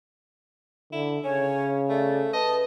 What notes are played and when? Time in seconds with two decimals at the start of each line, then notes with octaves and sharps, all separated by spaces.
0.92 D3 E4
1.24 C#3 C#4 C#5
1.89 A3 D5
2.33 B4 D#5 A5